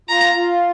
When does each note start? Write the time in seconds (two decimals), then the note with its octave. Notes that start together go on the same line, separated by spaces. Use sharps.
0.09 F4 A#5
0.34 F4